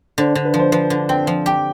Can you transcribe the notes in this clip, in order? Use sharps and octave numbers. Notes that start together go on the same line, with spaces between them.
D3 C5
D3
B4
F3
C5
F3 B4
D3
C4 G5
F3
G4 G5